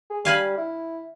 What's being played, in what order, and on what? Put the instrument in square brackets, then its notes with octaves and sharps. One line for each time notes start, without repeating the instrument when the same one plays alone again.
[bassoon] G#4
[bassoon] G3 [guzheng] F5 G#5 B5
[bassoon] E4